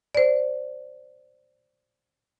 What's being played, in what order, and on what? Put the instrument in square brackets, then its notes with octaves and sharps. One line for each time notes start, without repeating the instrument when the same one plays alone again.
[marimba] C5 D5